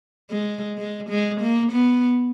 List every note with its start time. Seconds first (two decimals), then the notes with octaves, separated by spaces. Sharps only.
0.30 G#3
0.78 G#3
1.09 G#3
1.41 A#3
1.72 B3